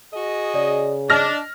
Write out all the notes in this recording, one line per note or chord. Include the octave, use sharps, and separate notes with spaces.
F#4 G#4 D#5
C#3 D5
D4 D#5 F6 A#6